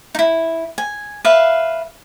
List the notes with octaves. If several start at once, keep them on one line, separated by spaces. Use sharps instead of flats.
D#4 E4
G#5
B4 E5 F5